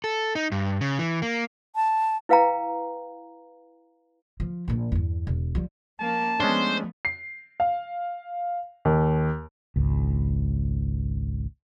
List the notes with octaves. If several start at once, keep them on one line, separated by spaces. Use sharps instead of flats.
A4
D#4
G2
C#3
E3
A#3
A5
E4 B4 F5 G5 A#5
F3
A#1 A#2
E2 G2
E1
F3 G3
F3 A#3 C#4 A5
F3 G#3 A3 B3 C#4 D4 C5
C7
F5
D#2
G#1 C#2